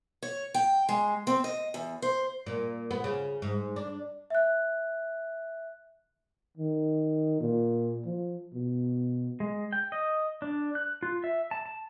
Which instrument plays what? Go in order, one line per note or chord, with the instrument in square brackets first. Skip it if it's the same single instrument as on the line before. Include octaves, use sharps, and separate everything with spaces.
[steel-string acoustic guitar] C#5
G5
G#3
C4
D#5
E2
C5
[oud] A#2
B3
C#3
G#2
D4
[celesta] E5 F#6
[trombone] D#3
A#2
F3
B2
[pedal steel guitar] G#3
G5
D#5
D4
F#6
F4
E5
A5
A5